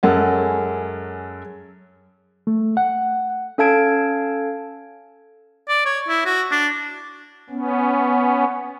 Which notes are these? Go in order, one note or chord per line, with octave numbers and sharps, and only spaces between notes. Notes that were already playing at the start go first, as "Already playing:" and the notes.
F#2 G#3 C#4 A4 A#4 F#5
A3
F#5
C#4 A4 F5 A5 G#6 D7
D5
C#5
E4
F#4
D4
B3 C#4